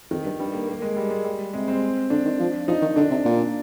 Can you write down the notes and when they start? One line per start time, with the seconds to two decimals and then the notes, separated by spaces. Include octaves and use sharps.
0.11 F2 D#3
0.25 G2
0.40 G2 G3
0.54 A#3
0.68 A#3
0.82 G#3
0.96 G3
1.11 G#3
1.24 G3
1.53 C3 G#3
1.68 C4
2.10 D3 D4
2.25 D#3
2.39 F3
2.68 F3 D#4
2.82 D#3
2.96 D3 D4
3.11 C3
3.25 A#2